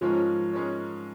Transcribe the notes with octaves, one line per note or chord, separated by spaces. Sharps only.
G#2 F3 G#3 C#4 A#4 C#5
G#3 C#4 A#4 C#5